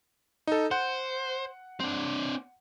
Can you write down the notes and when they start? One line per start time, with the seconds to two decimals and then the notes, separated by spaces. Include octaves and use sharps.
0.47 D#4 A4
0.71 C5 F#5
1.80 C4 D4